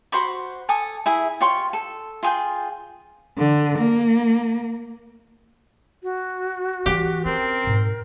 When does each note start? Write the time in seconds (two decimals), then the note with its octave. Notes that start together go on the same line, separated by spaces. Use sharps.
0.12 F#4 C5 B5 D6
0.69 A4 G#5 D6 D#6
1.06 E4 G#4 E5
1.41 F4 G4 C#5 C6
1.73 A4
2.23 F4 G#4 G5
3.38 D3
3.79 A#3
6.03 F#4
6.86 E3 G#3 G4
7.25 C4 C#4 A#4
7.64 G#2 B2